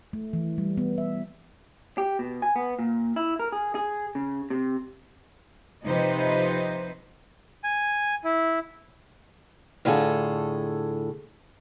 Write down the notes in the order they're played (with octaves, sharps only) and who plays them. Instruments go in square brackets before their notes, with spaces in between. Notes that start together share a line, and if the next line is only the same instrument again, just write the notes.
[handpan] A3
E3
G3
B3
E5
[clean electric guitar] G4
B2
G#5
B3
A#2
E4
A#4
G#4
G#4
C#3
C3
[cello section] C3 F3 D#4 B4 C5
[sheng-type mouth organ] G#5
E4
[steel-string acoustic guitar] A2 D3 A3 F4 G#4 A4